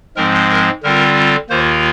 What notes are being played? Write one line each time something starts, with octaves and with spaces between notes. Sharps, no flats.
G#2 F3 G#3 C4 A#4
A#4
D3 G3 C4 F4 A#4
D#2 D#3 A#3 F4 C5